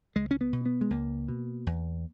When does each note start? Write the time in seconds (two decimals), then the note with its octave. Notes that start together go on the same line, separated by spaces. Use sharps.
0.16 C#2 G#3
0.31 C#4
0.41 B3
0.53 B2
0.66 B3
0.81 G#3
0.90 C#2 A#3
1.28 B2
1.67 E2